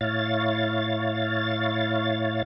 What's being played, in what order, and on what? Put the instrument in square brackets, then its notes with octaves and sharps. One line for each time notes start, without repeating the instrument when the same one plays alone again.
[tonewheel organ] A2 E4 C#5 F5 A6